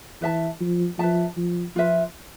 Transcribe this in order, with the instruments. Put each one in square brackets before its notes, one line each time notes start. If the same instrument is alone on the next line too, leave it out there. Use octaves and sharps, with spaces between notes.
[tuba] E3 [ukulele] B4 E5 A5
[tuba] F3
[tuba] F3 [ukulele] B4 E5 A5
[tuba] F3
[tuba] F3 [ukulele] F4 B4 E5